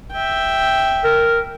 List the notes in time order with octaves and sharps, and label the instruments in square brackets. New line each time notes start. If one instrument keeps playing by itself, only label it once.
[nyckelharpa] E5 G5
[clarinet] A#4